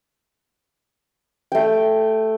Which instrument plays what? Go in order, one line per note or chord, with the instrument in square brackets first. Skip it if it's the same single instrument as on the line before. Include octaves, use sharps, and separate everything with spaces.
[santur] A3 G5